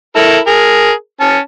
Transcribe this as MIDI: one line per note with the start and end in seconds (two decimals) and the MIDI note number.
0.16 0.37 64
0.16 0.37 69
0.16 0.37 70
0.47 0.91 68
0.47 0.91 70
1.21 1.38 61
1.21 1.38 81